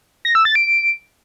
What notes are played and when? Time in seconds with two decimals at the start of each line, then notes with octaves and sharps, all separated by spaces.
0.25 A#6
0.35 E6
0.45 A6
0.55 D7